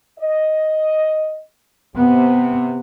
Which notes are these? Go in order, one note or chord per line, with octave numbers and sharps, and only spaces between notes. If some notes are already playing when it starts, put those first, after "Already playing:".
D#5
C3 B3